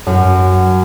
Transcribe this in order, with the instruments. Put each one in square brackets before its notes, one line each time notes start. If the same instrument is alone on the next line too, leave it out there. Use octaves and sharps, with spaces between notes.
[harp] F#2